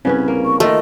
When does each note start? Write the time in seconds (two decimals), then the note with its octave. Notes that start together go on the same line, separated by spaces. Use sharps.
0.05 C2 C#3 B3 C#4
0.28 A#3
0.45 C#6
0.60 D#3 A3 F4 D#5